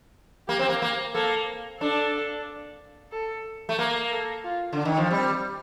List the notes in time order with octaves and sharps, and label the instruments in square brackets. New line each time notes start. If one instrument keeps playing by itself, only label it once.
[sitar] A#3 [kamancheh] G4
[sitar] C4
A#3
A#3
[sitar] A#3 [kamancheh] A4
[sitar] D4 [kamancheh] A4
[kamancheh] A4
[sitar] A3
[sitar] A#3 [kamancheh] A#4
[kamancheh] A4
F4
[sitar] D3 [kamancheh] D4
[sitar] D#3
F3
[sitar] G3 [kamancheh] C4